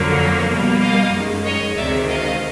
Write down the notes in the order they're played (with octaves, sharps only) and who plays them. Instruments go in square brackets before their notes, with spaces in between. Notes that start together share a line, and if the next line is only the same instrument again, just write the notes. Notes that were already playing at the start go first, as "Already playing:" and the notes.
Already playing: [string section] F2 D3 F#3 A#3
B2 G3 A#3
D#5 F5
F#2 D#3 G#3
C#5 D#5
D2 C3 D#3 G#3 D5 E5
D#5 F5